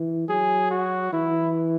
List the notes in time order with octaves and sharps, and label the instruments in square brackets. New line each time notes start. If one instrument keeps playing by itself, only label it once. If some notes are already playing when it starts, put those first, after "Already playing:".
Already playing: [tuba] E3
[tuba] F#3 [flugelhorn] G#4
[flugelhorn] F#4
[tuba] E3 [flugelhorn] E4